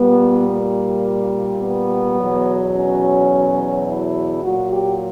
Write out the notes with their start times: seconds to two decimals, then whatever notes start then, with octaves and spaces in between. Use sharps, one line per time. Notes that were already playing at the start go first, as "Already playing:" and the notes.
Already playing: A#2 G3 B3
0.47 A#3
1.60 B3
2.17 E2 B2 F#3
2.73 C#4
3.87 E4
4.43 A#2 F#3 F#4
4.71 G4